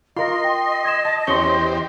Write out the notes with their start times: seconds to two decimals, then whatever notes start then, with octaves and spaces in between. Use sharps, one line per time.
0.16 F4 A#4 D#5 C6
0.44 G5
0.85 G#6 E7
1.05 A5
1.27 E2 C#4 G4 C5 C#5 C6 C#6 G7